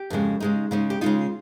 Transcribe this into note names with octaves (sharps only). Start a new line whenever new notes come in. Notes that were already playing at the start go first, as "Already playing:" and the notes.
Already playing: G4
F2 C#3 G#3
C#3 G#3 D#4
C#3 G#3 D#4
G4
C#3 G#3 D#4 F4